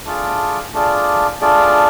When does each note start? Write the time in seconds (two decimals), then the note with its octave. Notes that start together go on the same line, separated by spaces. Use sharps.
0.05 A3 D4 F4 G#4 D5
0.73 A3 D4 F4 G#4 D5
1.41 A3 D4 F4 G#4 D5